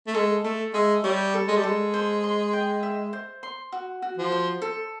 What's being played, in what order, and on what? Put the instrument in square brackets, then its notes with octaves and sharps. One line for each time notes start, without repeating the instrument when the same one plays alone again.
[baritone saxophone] A3
[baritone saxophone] G#3 [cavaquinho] A4
[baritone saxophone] A3 [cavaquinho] A4
[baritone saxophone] G#3 [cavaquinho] E5
[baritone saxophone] G3 [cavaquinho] C#5
[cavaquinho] A4
[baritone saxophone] G#3
G3
[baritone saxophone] G#3 [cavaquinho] A4
[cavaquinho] C5
C6
G5
E5
C5
C6
F#4
F#4
[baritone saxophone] F3
[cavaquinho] C5
A4